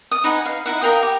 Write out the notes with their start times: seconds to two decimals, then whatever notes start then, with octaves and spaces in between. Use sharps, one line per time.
0.11 D#6
0.24 D#4 B4 F#5 G#5
0.46 F5
0.66 D#4 E4 F#5
0.81 A#4 F5 G5 D#6
1.03 G4